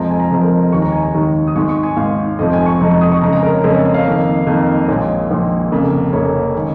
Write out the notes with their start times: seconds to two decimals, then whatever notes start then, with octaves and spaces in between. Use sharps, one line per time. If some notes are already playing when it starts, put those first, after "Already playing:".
Already playing: F1 F2 F3 G#3 A#5
0.11 G#5
0.20 A#5
0.30 F1 F2 F3 G#3
0.41 A#4
0.62 D#5
0.72 D#2 D#3 G#3 C#6
0.82 A#5
0.92 G#5
1.02 A#5
1.14 D#2 D#3 G#3
1.47 D#6
1.56 G#1 G#2 G#3 C#6
1.69 C#6
1.83 G#5
1.97 G#1 G#2 G#3 F5
2.39 F1 F2 F3 G#3 D#5
2.53 G#5
2.66 C#6
2.80 F1 F2 F3 G#3 A#5
2.91 C#6
3.01 D#6
3.12 C#6
3.22 F2 C#3 G#3 A#5
3.33 A#5
3.43 A#4
3.53 C#5
3.64 F2 C#3 G#3 A#4
3.74 C#5
3.85 D#5
3.94 F5
4.06 F2 D#3 A#3
4.47 F2 D#3 A#3
4.85 D#5
4.88 A#1 A#2 G#3 C#5
5.31 A#1 A#2 G#3
5.71 F1 F2 C#3 A#3
6.13 F1 F2 C#3 A#3 C#5
6.57 D#3 G#3